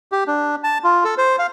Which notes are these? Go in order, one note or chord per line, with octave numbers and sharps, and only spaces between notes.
G4
D4
A5
F4
A4
C5
F5